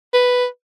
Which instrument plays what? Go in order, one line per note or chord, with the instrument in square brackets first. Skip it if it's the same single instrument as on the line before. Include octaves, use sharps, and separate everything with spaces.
[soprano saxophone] B4